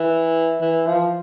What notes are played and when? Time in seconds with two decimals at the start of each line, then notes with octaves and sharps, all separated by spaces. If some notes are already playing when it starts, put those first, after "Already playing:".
Already playing: E3
0.61 E3
0.87 F3